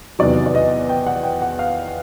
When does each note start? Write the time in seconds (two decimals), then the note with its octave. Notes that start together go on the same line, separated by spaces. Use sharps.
0.19 E2 C3 D#3 F#3 D5
0.46 D5
0.55 D#5
0.89 G5
1.07 F#5
1.23 G5
1.42 F#5
1.59 F5